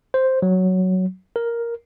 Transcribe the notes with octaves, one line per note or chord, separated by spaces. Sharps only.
C5
F#3
A#4